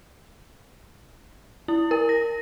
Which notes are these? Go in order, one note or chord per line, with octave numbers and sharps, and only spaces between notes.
E4
A#4
A#6